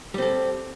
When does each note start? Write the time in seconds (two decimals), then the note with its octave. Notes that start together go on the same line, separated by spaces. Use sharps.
0.14 G3
0.18 C4
0.22 A4